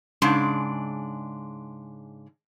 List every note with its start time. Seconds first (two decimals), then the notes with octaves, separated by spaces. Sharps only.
0.22 G#2 C#3 G#3 D4